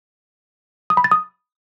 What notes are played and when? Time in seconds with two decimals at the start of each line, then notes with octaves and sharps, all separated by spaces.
0.90 D#6
0.97 B5
1.04 A6
1.11 D#6